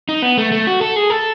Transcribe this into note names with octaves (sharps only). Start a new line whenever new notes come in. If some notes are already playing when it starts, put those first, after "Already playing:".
D#4
B3
A3
A3
F#4
A4
G#4
A4